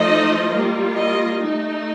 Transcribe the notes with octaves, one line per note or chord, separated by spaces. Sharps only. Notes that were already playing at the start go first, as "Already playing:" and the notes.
Already playing: F3 A3 D#4 D#5
G3 A#3 F4
D#5
A3 D#4